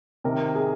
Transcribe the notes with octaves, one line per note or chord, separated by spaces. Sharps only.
C3 D#3 A#4
G#4